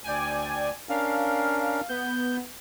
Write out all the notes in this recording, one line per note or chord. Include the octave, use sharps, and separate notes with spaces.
D2 D5 G5 G#5
C#4 D4 A#4 F5
B3 G6